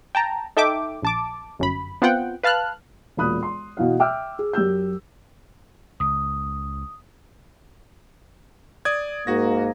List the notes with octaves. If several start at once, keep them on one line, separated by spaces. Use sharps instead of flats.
G5 A5 A#5
D#4 A4 E5 G5 D6
A#1 A5 D6
G1 F#2 B5
B3 C4 F4 F#5 G5
B4 F5 A5 F6 F#6
E1 A#2 F4 B5 D#6 F#6
C6
B2 E3 F5
E5 G5 D6 E6 F6
G#4
F#2 G4 E6 G6
C#2 D#6
D5 D#6 G#6
G#2 A#3 F#4 A#6